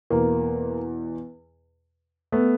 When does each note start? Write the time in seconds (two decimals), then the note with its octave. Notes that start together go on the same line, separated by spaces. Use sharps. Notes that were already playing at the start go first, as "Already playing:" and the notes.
0.10 E2 B2 A#3
2.32 A3 B3